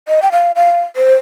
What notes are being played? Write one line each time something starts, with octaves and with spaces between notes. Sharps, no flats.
D#5
G5
F5
F5
C5